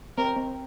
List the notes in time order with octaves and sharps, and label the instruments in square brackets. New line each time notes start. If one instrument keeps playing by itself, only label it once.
[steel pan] C4 [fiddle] A#4
[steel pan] C4